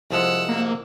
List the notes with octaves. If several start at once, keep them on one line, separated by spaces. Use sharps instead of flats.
C2 F3 G#3 F#5 E6
A#3